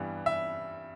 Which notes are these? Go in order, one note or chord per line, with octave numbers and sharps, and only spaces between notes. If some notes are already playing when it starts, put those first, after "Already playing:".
Already playing: G2 E3 G3 B3
E5